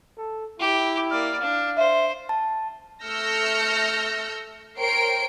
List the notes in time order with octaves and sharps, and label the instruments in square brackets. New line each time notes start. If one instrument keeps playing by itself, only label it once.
[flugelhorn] A4
[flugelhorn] E4 [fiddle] G4
[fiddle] A#3 D5 [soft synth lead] F6
[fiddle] D4 [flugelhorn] F5
[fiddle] C5 [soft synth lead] E5
[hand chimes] A5
[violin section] A3 E6 F6 G6 A#6 C#7
A#4 C5 C#5 G5 C7 D7